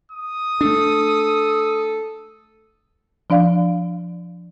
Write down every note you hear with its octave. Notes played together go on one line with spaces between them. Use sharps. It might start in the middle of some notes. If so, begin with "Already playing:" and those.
D#6
A3 D4 A4
F3 D4 D5 F5